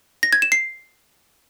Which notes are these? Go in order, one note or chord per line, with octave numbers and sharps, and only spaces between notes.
A#6
G#6
E7
C7